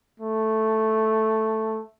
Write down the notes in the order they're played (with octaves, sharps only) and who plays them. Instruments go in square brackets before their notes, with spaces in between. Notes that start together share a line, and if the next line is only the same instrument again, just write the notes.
[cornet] A3